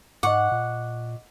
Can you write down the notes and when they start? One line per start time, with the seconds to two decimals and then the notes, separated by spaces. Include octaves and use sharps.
0.23 G#2 D#5 F#5 C#6 D6
0.52 A#2